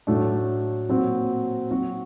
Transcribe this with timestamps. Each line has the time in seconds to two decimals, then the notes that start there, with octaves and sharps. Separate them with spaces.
0.07 A2 F#3 A3 D4
0.89 A#2 F#3 C4 F#4
1.71 F#3 C4 F#4